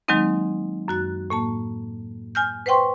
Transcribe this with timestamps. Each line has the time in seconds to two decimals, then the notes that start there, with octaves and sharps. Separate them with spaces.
0.08 D#3 F#3 G#3 A#3 C4 D#4
0.88 F#2 F#4 F#6
1.30 A2 A#3 A5
2.35 G#5 F6 G6
2.66 B4 C5 F#5 G5 C6 C#6